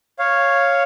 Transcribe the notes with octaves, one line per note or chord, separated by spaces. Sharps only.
C#5 F5